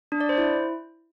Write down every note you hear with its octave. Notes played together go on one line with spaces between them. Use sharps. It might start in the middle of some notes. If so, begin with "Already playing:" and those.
D4
D5
C5
E4